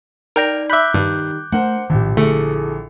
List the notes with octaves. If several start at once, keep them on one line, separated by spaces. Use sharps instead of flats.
D#4 A#4 D5 G5 A#5
E5 B5 D6 F#6 G6
G2 D#3 G3
A3 D4 A#4 C5 F#5
A#1 A2 D#3 G4
D3 A3 E4 G#4 A4